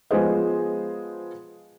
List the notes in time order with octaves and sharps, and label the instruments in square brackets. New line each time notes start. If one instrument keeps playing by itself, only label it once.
[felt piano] F3 G#3 B3 G#4 C5 D#5